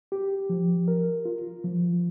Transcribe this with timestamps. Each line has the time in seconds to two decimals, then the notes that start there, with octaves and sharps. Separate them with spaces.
0.12 G4
0.50 F3
0.88 A#4
1.25 F4
1.64 F3